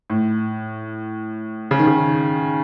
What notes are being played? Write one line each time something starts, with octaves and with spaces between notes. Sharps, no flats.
A2
C#3
D#3
C#3